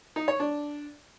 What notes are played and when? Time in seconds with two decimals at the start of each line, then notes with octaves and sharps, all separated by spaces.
0.16 D#4
0.28 C#5
0.40 D4